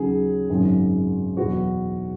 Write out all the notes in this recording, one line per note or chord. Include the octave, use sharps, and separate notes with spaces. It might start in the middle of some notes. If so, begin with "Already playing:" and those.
Already playing: D#2 C#3 F#3 G#4
G#1 F#2 C#3 F#3
E2 B2 F#3 F#4